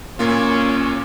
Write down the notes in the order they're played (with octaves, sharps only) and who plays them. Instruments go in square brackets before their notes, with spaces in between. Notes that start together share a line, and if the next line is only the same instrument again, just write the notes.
[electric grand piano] A#2 A#3 F4 [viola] C#4